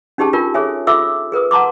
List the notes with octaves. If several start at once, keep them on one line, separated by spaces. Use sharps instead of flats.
C#4 D#4 G4 G#4 A5
D4 F4 A#4
G#4 A4 C#5 E5 G#5
F4 A4 E5 D6 E6
G#4 A#4 B4 D#6
F#5 A5 A#5 C6 D6